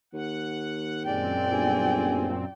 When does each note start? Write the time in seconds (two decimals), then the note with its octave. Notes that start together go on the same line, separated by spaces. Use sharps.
0.14 D#2 F#5
1.03 F#2 A#2 G#3 C4 D5 G5
1.52 G1 G#4